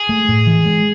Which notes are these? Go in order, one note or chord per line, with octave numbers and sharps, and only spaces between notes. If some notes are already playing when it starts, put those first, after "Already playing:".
Already playing: G#4
A3
A2
E3
G#3